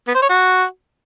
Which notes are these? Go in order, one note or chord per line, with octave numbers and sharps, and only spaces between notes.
B3
C5
C#5
F#4